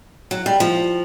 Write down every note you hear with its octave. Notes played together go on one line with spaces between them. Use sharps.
F#3
G3
F3